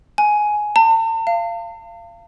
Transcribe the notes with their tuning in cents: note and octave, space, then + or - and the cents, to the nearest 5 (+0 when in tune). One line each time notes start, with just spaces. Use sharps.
G#5 +10
A5 +45
F5 -25